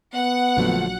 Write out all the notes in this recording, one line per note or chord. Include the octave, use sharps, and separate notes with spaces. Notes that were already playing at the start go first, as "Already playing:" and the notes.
B3 F#5
A#1 D3 F3 F#3 A3